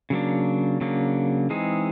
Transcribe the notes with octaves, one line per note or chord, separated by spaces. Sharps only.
C#3 F#3 A#3 D4
C#3 F#3 A#3 D4
E3 G#3 C4 D#4 G#4